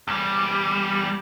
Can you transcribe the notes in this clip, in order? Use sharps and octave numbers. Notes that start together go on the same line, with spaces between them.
E2 G3